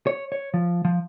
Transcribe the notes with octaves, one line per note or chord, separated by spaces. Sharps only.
C#5
C#5
F3
F3